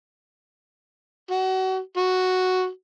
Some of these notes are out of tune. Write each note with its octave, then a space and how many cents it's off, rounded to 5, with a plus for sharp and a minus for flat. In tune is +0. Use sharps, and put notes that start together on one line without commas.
F#4 +30
F#4 +0